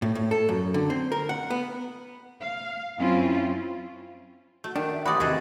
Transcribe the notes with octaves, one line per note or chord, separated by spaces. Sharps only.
A2
A2
A4
F#2
D3
C4
A#4
F#5
B3
F5
F#2 C4 C#4 E4 F4
A3 F#4
D#3 D4
E5
A1 F#4 C5 D5 B5 D#6
D#2 C3 F#4 G#4 A4 B4 D#5